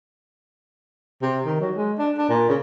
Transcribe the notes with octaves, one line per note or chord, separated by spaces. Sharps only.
C3
D#3
F#3
G#3
D4
D4
A#2
C#3